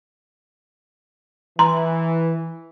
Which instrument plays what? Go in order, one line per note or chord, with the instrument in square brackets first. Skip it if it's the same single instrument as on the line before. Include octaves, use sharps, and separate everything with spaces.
[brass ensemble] E3 [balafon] A#5 C6